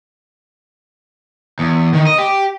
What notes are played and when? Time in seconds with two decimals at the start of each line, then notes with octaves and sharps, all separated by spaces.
1.59 E2
1.94 D#3
2.07 D#5
2.18 G4